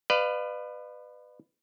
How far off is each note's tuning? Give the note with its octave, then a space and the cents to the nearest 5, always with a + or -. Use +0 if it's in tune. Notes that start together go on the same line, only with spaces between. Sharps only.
B4 +15 D5 +45 F5 +0